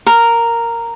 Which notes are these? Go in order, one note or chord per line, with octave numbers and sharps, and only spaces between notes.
A#4